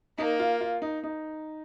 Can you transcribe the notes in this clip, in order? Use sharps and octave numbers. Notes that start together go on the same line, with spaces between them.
A#3 D#4
F4
F4
D#4
D#4